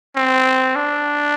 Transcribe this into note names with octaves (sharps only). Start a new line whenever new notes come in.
C4
D4